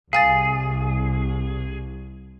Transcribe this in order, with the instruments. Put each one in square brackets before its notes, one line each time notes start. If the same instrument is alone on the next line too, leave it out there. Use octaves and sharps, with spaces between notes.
[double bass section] C2 [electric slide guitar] G#4 [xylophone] F5 G#5 A6